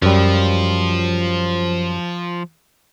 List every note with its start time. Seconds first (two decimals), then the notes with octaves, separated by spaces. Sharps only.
0.02 F#2 F3 G3